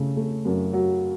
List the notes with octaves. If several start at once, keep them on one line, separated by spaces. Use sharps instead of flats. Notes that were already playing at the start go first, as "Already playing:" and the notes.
Already playing: C#3 A3
A3
F#2
F#3